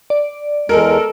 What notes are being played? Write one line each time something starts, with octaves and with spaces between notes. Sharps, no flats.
D5
E2 G#3 A4 A#4